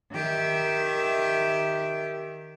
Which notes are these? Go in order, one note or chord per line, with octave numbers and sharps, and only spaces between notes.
D#3 G4 E5